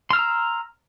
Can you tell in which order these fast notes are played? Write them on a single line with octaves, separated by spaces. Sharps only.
C6 F6 E6 A#5